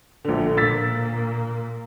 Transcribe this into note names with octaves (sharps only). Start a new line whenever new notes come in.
A#1 D3
A#2 A#3 E6 A6 B6